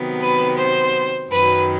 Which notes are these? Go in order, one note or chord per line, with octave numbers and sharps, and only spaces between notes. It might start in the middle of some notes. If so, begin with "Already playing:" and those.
Already playing: C3 D#3 F#3 B3
B4
C5
F#2 D#3 F#3 B4